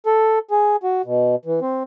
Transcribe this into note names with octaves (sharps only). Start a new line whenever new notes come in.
A4
G#4
F#4
B2
E3
C4